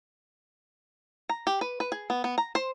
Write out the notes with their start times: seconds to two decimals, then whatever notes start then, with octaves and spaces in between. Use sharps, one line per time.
1.29 A#5
1.47 G4
1.61 B4
1.80 B4
1.92 G#4
2.10 B3
2.24 B3
2.38 A#5
2.55 C5